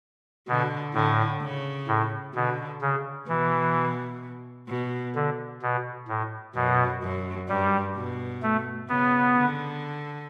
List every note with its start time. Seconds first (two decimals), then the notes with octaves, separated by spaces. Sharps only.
0.48 B2 D3
0.94 A2 D3
1.42 C#3
1.88 A2
2.34 B2 D3
2.82 C#3
3.28 B2 E3
4.68 B2
5.15 D3
5.62 B2
6.08 A2
6.55 F#2 B2
7.02 F#2
7.48 G2 G3
7.96 B2
8.42 A3
8.89 C#3 B3
9.36 D3